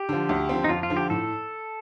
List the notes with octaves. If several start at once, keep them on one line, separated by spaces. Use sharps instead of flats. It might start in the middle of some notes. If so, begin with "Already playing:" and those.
Already playing: G4
D3 F3
D2
D3 F3 C4
D#4
F2 F4
F4
D3 F3
G4
A2 A4